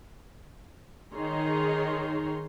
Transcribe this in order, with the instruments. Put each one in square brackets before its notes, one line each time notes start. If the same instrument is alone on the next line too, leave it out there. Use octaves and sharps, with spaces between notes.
[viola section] D#3 D#4 G#4 C#5 A#5 C6